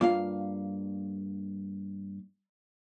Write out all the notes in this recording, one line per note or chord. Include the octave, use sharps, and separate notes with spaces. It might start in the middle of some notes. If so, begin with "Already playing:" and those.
G2 A#3 F4 F5